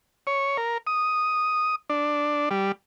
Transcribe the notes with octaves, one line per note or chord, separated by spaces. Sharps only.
C#5
A#4
D#6
D4
G3